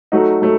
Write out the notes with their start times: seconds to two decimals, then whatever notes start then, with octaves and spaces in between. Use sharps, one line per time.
0.12 F#3 A3 D#4 F#4
0.42 F#3 A3